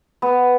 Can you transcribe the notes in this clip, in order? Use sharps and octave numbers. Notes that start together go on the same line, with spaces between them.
B3